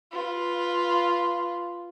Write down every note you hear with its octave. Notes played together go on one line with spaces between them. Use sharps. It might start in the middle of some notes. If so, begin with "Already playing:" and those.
F4 B4